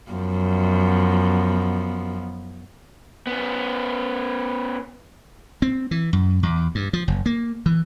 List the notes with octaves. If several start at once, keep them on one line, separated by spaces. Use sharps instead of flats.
F#2 F3 B3
B3 C#4
C4
E3
F#2
E2
G2
F3
F#1
A#3
E3